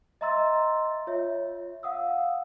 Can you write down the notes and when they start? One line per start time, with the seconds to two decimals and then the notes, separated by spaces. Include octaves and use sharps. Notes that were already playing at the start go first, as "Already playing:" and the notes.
0.21 D#5 E5 A#5 C6 E6 A6
1.07 F4 C#5 E5
1.83 F5 F#5 D#6 E6